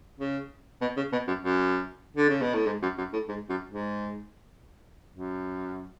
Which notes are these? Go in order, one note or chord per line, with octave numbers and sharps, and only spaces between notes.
C#3
B2
C#3
B2
F#2
F#2
D3
C#3
B2
A2
G#2
F#2
F#2
A2
G#2
F#2
G#2
F#2